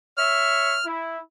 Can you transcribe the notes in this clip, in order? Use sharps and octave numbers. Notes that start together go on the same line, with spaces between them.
C#5 E5 F6
E4